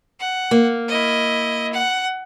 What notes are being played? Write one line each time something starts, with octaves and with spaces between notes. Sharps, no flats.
F#5
A#3
E4 D#5
F#5